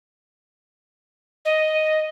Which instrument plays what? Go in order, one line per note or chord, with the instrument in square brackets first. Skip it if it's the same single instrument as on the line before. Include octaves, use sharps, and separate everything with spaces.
[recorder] D#5